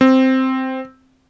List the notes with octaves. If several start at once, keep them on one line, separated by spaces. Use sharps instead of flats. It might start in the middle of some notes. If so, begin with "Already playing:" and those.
C4